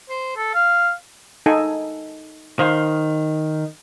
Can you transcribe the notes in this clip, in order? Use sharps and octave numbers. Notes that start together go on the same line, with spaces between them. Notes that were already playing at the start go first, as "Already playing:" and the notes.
C5
A4
F5
D#4 A4 G#5
D#3 C5 F5